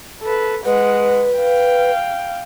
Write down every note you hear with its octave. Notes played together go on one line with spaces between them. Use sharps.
A4 B4
G#3 B4 F#5
F5 G5